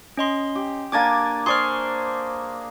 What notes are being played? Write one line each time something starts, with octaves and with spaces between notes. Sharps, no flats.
C#4 D#5 C6
G4
A#3 D4 G#5 D6 G#6 A6
G#4 C5 D5 C6 C#6 F6